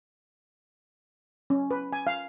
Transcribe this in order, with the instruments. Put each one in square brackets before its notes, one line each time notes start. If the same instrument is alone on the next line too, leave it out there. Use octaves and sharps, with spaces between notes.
[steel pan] C#4
B4
G#5
F5